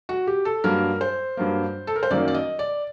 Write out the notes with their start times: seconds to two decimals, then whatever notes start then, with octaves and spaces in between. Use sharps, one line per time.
0.09 F#4
0.27 G4
0.45 A4
0.64 G2 F#3 A#3 A#4
1.01 C5
1.37 G2 F#3 A#3
1.87 A4
1.96 A#4
2.03 C5
2.10 F#2 D#3 F#3 A#3 D5
2.28 D5
2.34 D#5
2.59 D5